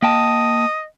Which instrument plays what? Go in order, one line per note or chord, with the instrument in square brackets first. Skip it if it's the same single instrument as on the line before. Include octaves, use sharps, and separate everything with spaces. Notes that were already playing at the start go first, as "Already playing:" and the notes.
[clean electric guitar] A#3 G5 A5 [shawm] D#5